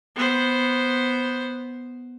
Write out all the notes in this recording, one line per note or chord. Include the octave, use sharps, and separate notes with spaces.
B3 C5